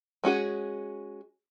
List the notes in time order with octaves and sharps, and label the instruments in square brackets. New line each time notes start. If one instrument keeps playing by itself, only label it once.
[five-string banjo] G#3 C#4 F#4 G#4